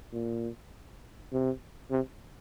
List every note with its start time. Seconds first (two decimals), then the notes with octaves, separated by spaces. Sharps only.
0.13 A#2
1.33 C3
1.91 C3